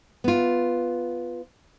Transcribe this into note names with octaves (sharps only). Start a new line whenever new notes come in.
B3 F4